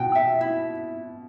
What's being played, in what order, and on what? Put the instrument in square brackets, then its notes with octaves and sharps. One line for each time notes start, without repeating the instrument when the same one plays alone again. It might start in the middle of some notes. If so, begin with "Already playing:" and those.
Already playing: [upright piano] B2 [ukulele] F#4 G5
[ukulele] E5
E4